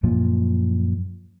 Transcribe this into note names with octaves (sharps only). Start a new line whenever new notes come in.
F#2 A#2 F3